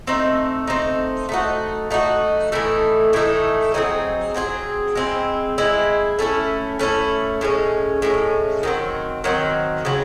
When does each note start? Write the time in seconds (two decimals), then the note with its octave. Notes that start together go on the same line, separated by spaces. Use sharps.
0.07 A3 C4 D#4
0.68 A3 C4 D#4
1.29 A3 D#4 F#4
1.91 A3 D#4 F#4
2.52 A2 E3 A3 D#4
3.13 A2 E3 A3 D#4
3.74 F#3 C4 D#4 G#4
4.34 F#3 C4 D#4 G#4
4.96 G#3 C4 E4
5.58 G#3 C4 E4
6.19 A3 C#4 E4
6.79 A3 C#4 E4
7.41 A2 G#3 C#4
8.02 A2 G#3 C#4
8.63 D#3 F#3 C4
9.24 D#3 F#3 C4
9.85 C#3 F#3 C4